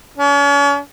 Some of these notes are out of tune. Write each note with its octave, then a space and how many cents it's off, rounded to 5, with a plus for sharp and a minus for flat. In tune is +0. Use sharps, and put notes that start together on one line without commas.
C#4 +40